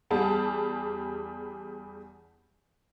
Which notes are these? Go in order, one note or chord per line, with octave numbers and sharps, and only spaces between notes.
E2 G3 G#4 A5